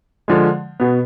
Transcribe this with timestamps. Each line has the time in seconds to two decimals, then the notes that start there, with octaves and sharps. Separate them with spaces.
0.28 D3 F3 G#3
0.80 B2 B3